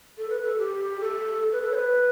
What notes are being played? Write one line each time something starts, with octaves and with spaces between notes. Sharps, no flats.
A4
B4
A4
G4
A4
B4
A4
C#5
B4